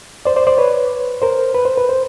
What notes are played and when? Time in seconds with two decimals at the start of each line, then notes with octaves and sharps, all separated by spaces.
0.25 C5 D5
0.36 C5 D5
0.47 C5 D5
0.58 B4 C#5
1.22 A#4 C5
1.55 B4
1.65 C5
1.78 B4
1.89 C5